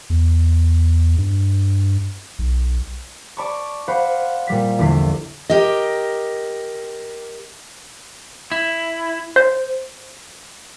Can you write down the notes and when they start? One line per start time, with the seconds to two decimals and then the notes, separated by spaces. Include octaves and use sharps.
0.10 E2
1.18 G2
2.39 B1
3.37 D5 A5 B5 C#6
3.88 C5 F5 F#5 B5
4.47 A#2 G3 B6
4.78 A#1 E2 D3 B6 C7
5.50 G4 A#4 D#5
8.52 E4
9.36 C5